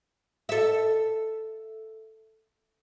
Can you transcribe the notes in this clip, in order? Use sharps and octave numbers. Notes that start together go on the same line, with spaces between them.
A4 E5